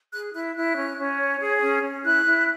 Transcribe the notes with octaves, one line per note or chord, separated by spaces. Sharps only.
G#4 F#6
E4 F#6
E4 F#6
C#4
C#4
C#5
G#4
C#4
C#4
E4 F#6
E4